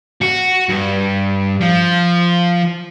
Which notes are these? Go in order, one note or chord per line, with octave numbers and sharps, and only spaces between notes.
F#4
G2
F3